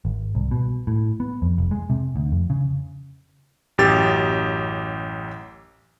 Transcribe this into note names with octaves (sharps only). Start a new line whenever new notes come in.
G#1
C2
B2
A2
B3
F2
F1
G#3
C3
D2
F2
C#3
A1 F#2 G4 A6